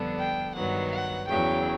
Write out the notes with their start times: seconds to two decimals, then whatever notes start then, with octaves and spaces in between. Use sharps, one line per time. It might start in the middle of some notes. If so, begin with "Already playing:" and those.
Already playing: F2 D3 G3 B3 D4
0.19 G5
0.55 G2 D#3 F#3 B3 F#5
0.92 F#5
1.28 E2 C#3 F#3 G5